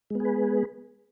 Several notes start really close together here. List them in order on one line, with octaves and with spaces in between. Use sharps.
G#3 B3 G#4 B4